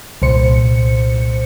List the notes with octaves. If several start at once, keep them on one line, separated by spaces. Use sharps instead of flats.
C2 A#2 C5 C#7